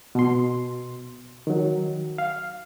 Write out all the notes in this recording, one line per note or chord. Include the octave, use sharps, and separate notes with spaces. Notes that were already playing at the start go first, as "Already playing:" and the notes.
B2 C6
D#3 F#3
F5